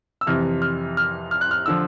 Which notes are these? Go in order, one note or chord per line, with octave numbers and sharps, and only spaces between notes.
E6
F2 C3 E3 F6
F6
F6
F6
F#6
F6
D3 F3 E6